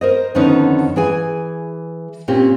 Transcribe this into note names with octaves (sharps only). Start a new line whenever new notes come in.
A#4 C5 D#5
F2 D3 D#3 B3 C#4 D#4
E3 G#4 G#5
A#2 C4 C#4 G4